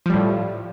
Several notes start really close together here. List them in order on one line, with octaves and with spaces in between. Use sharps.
F3 G3 A2